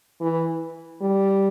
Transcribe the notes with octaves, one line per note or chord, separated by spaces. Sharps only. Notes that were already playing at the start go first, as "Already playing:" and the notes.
E3
G3